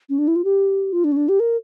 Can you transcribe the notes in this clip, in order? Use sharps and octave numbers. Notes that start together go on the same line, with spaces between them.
C#4
D4
E4
F4
G4
F4
D4
C#4
D4
G4
A#4